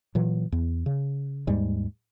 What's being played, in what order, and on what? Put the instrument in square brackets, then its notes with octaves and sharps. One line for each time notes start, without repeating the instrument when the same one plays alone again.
[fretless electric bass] A#2 E3 F#3
E2
C#3
D#2 G#2 G3 G#3